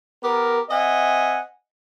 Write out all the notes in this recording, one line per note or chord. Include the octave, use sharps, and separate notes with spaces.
B3 G4 A#4
C4 D#5 E5 F#5 G#5